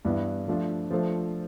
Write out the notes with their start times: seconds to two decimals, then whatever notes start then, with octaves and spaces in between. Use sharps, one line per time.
0.05 G2 E3 B3 E4
0.48 F3 A3 D4 F4
0.91 F3 A3 D4 A4 C5